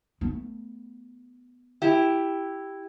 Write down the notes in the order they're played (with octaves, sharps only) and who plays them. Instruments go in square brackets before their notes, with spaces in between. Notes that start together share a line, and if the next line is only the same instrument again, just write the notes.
[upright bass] A3 B3
[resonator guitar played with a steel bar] E4 G4